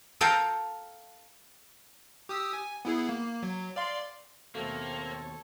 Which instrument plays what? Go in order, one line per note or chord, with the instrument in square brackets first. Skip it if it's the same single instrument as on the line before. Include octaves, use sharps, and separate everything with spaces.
[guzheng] A4 F5 G5 A#5
[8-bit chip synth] G4 D#6 E6
G#5
B3 E4 G#4
A#3
F#3
D5 F5 C6
[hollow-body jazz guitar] D#2 B2 A3 [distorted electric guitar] A#3 [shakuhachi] C4 [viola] A4 C#5